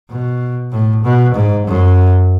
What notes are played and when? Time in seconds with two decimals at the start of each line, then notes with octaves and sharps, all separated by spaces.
0.10 B2
0.72 A2
1.04 B2
1.34 G#2
1.67 F#2